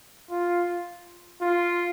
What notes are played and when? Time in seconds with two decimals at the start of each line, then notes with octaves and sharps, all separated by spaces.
0.31 F4
1.42 F4